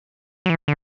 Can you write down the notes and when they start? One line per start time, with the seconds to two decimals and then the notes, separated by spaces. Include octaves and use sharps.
0.46 F#3
0.50 E3
0.68 D3